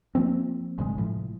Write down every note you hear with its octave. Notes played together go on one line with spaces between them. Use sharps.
F3 A#3 C4
G1 C3 G#3
A2 F3